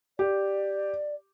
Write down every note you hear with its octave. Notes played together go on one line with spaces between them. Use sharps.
G4 D5